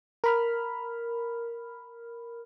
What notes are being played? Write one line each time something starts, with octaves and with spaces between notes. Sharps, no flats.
A#4 B5 F6